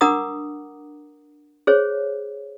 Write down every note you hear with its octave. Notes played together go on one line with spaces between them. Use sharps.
D4 A#4 F#5 A#5 D6 D#6
G#4 C5 C#5